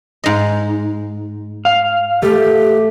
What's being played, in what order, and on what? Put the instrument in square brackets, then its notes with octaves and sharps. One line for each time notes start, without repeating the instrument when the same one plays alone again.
[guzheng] G#2 D#5
[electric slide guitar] F5
[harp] A3 [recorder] G4